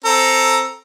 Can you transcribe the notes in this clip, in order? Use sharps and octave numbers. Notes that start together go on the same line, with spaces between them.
C4 A4 A#5